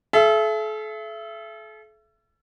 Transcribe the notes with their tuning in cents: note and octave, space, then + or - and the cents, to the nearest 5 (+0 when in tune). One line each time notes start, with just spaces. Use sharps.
A4 -40 E5 +30